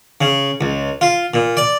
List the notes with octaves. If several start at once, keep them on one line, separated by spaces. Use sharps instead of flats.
C#3
C#2
F4
A#2
D5